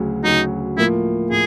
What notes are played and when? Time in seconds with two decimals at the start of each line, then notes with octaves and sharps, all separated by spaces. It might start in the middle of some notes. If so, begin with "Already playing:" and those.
Already playing: D2 C#3 F#3
0.24 D2 C#3 F#3 D#4
0.77 A2 F3 A#3 E4
1.31 A2 G#4